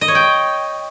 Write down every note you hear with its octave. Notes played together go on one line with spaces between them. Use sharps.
D#5
C#5
G5